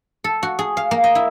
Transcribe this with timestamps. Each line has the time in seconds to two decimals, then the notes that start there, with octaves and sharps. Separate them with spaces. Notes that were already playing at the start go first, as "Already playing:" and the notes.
0.24 A4
0.43 F#4
0.59 G#4
0.77 F5
0.91 A#3
1.04 D#5
1.15 E4